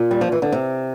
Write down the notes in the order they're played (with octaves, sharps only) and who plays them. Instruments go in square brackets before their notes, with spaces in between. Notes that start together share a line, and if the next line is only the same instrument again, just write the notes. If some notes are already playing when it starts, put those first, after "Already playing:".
Already playing: [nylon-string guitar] A#2
G3
F3
E3
D3
C3